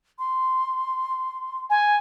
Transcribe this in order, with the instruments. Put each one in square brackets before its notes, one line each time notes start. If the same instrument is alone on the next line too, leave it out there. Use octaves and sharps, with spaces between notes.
[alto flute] C6
[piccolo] G#5